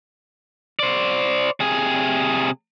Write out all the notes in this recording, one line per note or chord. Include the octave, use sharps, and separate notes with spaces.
C5 D5
C3 G#4